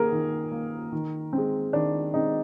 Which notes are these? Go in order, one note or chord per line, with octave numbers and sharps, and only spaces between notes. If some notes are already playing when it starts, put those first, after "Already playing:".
Already playing: D#3 A#3 G#4 A#4
D#3
A#3
D#3
G#3 C4
D#3 D4
G#3 C4 D#4